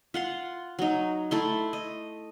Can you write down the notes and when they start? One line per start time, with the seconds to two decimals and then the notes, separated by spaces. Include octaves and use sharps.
0.14 F4 F#5 C6
0.79 F#3 D#4
1.31 A3 E4 C6
1.73 D#5